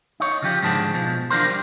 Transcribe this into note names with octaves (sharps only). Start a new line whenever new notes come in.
D#4 C#5
C#3 F3 G4
G#2 D3 F3 D#4 G#4 A5
B2 F3
E3 D4 F4 A#4 C5
G3